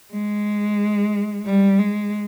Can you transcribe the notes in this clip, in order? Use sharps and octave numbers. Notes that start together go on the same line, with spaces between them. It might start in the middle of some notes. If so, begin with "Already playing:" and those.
G#3
G3
G#3